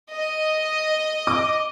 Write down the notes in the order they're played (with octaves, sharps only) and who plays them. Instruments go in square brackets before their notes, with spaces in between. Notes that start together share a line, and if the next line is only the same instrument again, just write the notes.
[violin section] D#5
[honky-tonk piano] D6